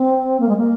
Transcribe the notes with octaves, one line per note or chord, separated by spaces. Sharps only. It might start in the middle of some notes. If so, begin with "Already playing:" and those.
Already playing: C4
A#3
G#3
A#3